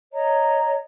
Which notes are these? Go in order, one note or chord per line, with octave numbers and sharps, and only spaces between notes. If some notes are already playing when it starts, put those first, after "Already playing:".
C#5 D#5 A#5